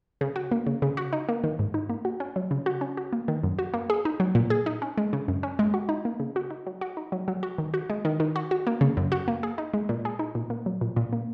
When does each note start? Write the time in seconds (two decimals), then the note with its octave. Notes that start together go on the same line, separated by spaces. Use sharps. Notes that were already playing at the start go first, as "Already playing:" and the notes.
0.21 C#3
0.36 F#4
0.52 A#3
0.67 C#3
0.82 C#3
0.97 F#4
1.13 D#4
1.29 A#3
1.44 D#3
1.59 G#2
1.74 D#4
1.90 A#3
2.05 F#4
2.20 C#4
2.36 F#3
2.51 C#3
2.66 F#4
2.81 C#4
2.97 F#4
3.13 A#3
3.28 D#3
3.44 F#2
3.59 F#4
3.74 A#3
3.90 G#4
4.05 D#4
4.20 F#3
4.35 A#2
4.50 G#4
4.66 D#4
4.82 C#4
4.98 G#3
5.13 C#3
5.28 F#2
5.43 C#4
5.59 G#3
5.74 F#4
5.89 D#4
6.05 A#3
6.20 C#3
6.36 F#4
6.50 D#4
6.67 F#3
6.81 F#4
6.97 D#4
7.12 F#3
7.28 F#3
7.43 F#4
7.58 D#3
7.74 F#4
7.90 G#3
8.05 D#3
8.20 D#3
8.36 F#4
8.51 F#4
8.67 A#3
8.81 C#3
8.97 F#2
9.12 F#4
9.28 A#3
9.43 G#4
9.58 D#4
9.74 G#3
9.89 A#2
10.05 G#4
10.19 D#4
10.35 A#2
10.50 A#3
10.66 F#3
10.81 A#2
10.96 A#2
11.13 A#3